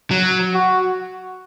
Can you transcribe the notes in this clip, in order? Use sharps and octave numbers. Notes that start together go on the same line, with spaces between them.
F#3
F#4